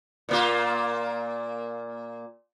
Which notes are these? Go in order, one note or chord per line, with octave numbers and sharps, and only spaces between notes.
A#2 A#3 F4